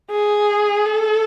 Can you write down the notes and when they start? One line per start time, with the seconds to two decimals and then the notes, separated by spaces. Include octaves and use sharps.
0.11 G#4
0.85 A4